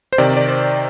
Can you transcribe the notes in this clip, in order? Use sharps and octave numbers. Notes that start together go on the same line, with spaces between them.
C5
C3 D#3 D5
D5
C5